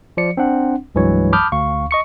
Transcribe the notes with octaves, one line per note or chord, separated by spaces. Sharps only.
F3 D5 C#7
C4 D4 F#5
C2 G2 E3 F#3 G#3 C#5
A5 B5 D6 D#6 F6 G6
D2 F5 C#6
D#5 C#6 C#7